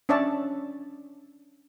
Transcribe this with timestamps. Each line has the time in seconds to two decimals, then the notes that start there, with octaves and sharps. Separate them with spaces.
0.09 C#4 D4 C#5 D5 E5 A5